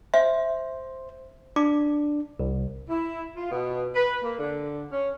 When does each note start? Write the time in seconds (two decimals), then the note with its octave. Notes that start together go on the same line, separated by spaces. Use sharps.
0.14 C5 E5
1.56 D4 D6
2.40 C2
2.89 E4
3.36 F4
3.51 B2
3.94 B4
4.23 A#3
4.39 D3
4.91 C#4